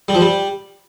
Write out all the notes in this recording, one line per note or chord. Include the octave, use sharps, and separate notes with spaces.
G3
F3
G3